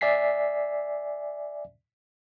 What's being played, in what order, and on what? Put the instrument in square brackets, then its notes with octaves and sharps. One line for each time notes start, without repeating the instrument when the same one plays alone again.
[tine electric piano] D5 E5 G#5 B6 C7